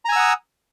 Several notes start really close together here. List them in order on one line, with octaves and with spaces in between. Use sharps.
A#5 G#5 E6 F#5 D#6